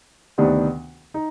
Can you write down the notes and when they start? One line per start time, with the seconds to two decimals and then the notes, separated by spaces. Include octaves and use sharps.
0.38 D2 C3 D#3 B3 D4
1.14 D#4